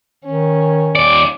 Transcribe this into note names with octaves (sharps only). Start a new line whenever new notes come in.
D#3 C#4
D#2 D5